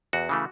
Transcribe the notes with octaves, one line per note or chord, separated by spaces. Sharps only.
E2 F#4
C#3 E3 A3